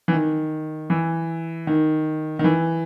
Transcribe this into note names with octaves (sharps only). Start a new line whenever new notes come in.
E3
D#3
E3
D#3
D#3
E3